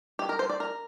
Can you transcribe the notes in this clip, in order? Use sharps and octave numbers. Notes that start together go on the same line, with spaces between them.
G4
A#4
C5
D5
A#4